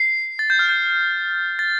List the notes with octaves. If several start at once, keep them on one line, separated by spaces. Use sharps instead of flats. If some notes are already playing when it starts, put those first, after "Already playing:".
Already playing: C7
A6
G6
F6
G6
A6